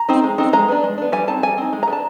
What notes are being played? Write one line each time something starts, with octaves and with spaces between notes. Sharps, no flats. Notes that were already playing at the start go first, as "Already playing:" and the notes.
Already playing: A#5
C4 D#4
G#3
C4 D#4
G#3 A#5
B3 D4
G#3
B3 D4
G3 G#5
C4 D#4 A5
G3 G#5
C4 D#4
G#3
A#5
B3
D4 A5